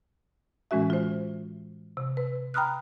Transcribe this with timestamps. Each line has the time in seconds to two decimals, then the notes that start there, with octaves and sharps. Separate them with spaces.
0.71 A2 E3 G#3 C#4 F#4 E5
0.90 F4 C5
1.97 C3
2.17 B4
2.54 G5 A#5 B5 D#6 F6 F#6